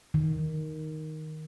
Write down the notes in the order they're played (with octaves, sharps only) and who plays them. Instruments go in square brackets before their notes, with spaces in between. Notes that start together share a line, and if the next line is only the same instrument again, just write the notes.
[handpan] D#3